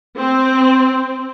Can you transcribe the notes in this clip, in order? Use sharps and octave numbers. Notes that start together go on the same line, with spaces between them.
C4